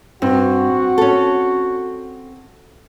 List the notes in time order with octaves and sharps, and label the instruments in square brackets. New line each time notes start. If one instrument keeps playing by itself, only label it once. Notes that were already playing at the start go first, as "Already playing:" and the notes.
[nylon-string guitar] G2 [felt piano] C4 [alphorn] F#4
[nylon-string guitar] C#4 A4